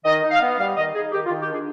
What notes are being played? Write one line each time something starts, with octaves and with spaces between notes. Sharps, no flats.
D#3 D#5
D#4
F5
B3
G3 F5
D#3 D#5
D#4 G#4
D#3 G4
F4
D#3
G4
D4 G#4